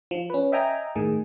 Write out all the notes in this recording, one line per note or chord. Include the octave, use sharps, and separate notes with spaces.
F3
C#4 B4
D#5 E5 G5 G#5 A#5
A2 D#3 G#4